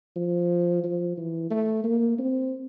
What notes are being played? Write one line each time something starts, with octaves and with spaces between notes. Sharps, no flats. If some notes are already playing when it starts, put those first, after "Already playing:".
F3
F3
E3
A3
A#3
C4